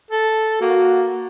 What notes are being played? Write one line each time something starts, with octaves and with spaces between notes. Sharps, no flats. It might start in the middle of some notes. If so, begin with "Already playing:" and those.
A4
A#3 F#4